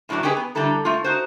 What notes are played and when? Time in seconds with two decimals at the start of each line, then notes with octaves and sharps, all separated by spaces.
0.09 F#2 A2 E3 F#3 D4
0.23 C#4 D#4 G4 G#4 A#4 B4
0.37 B3
0.55 D3 G3 E4 A4 A#5
0.85 A3 F4
1.04 D#4 F#4 C5